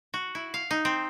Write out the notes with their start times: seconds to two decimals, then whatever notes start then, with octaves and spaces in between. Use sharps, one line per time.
0.14 F#4
0.35 E4
0.54 F5
0.71 D#4
0.85 C4